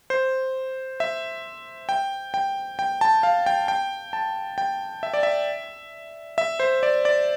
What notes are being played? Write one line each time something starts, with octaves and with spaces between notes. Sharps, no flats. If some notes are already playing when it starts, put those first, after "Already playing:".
C5
E5
G5
G5
G5
A5
F5
G5
G5
A5
G5
E5
D5
E5
E5
C5
D5
D5